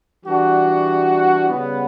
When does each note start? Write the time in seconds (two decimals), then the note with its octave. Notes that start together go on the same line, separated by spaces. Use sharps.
0.23 E3 G3 D4 F#4
1.49 C#3 G3 B3